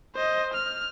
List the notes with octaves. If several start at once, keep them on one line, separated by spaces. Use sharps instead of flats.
C5 D#5
F6